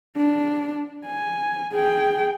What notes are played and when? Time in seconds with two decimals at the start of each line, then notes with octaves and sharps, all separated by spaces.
0.17 D4
1.06 G#5
1.73 G#4 G5